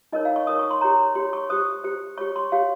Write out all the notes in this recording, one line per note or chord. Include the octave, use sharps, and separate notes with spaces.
D#4 A#4 C#5 D#5
F5
C#6
D#4 A#4 C#5 D#6
C#6
C6
G4 C#5 A#5
G4 C#5 C6
C#6
G4 C5 D#6
G4 C5
G4 C#5 C#6
C6
G4 C#5 F5